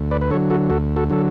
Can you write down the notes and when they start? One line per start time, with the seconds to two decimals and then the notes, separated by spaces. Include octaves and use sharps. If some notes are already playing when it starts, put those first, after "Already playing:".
Already playing: D2
0.11 B4 D5
0.21 B4
0.30 D3 A4 C#5
0.34 F#3
0.50 F#4 A4
0.70 D2 F#4 A4
0.96 F#4 A4
1.10 D3 F#3 A4